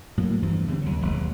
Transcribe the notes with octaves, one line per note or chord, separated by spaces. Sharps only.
A2 F#3 A#3
E2 G2 E3 F3
E2 D3 G3 C4
D#2 F#3
E1 D#2 F#3 G#3